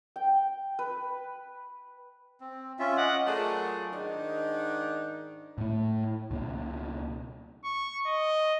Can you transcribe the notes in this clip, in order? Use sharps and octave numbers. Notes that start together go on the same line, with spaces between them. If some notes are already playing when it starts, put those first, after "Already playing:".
G5
B4
C4
C#4 F4 E5
D#5 F#5 D6
F#3 A3 F4 G#4 A#4 D5
G#2 D#3 D4 D#4
A2 A3
C#2 B2 A#3
C#6
D#5